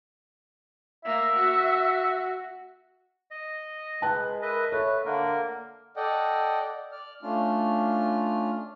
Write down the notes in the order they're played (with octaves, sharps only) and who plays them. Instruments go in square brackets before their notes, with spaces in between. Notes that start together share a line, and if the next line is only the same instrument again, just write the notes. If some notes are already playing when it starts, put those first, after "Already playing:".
[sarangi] A#3 [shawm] E5
[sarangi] F#4
[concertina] D#5
[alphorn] G#3 [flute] B4 [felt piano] A5 F#6
[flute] A#4 [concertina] B4 D#5 E5
[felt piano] A4 [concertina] B4 [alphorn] C#5 [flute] E5
[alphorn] D3 [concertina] A#3 A#4 [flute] F#5
[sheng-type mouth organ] A4 D5 D#5 F#5 G5
D5 F6
A3 C#4 D4 F4 F6